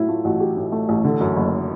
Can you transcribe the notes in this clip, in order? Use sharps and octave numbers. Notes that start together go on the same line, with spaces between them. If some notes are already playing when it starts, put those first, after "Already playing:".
Already playing: A2 F#3 E4
A3 F4
A1 F#4
F#3 G4
A2
A3
A1
D3
F#2
F#1